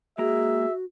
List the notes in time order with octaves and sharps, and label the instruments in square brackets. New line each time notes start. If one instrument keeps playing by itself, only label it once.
[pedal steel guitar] G#3 A#3 A#5 [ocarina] F#4 [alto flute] G#4 [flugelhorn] E5